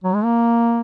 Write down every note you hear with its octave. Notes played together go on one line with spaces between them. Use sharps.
F#3
G#3
A#3